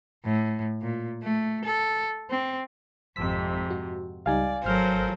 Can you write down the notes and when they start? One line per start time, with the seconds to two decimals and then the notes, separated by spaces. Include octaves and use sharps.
0.25 A2
0.82 A#2
1.23 A3
1.65 A4
2.31 C4
3.16 G#1 F2 G#2 C3 E6 B6
3.70 F#4
4.26 C#2 G3 D#4 D5 F5 G#5
4.64 G#1 F#3 A4 A#4 C5 F6